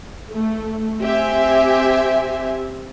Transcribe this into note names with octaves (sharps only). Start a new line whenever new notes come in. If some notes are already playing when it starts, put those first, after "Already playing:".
A3
C4 G4 E5 G#5